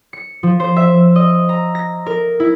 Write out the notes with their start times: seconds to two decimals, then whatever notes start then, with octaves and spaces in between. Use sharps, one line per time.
0.13 C#7
0.43 F3
0.60 C5
0.76 E5
1.16 D#5
1.49 A#5
1.75 A#6
2.06 A#4
2.40 E4